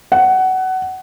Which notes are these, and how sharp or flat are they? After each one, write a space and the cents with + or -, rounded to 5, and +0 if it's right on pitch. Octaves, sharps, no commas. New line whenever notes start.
F#5 +20